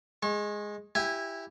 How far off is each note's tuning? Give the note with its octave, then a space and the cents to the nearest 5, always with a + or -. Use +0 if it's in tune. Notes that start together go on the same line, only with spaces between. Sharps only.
G#3 +0 C#6 -40
E4 +0 G4 +0 G#5 -20